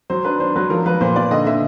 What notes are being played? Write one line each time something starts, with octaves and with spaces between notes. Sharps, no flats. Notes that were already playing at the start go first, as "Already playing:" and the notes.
F#3 C5
D4 B4
D4 C5
F#3 B4
F3 A#4
F3 B4
A#2 C5
A#2 D5
D3 D#5
D3 E5